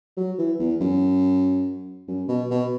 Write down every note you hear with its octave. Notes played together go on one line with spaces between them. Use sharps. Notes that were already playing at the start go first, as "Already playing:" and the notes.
F#3
E3
E2
F#2
F#2
B2
B2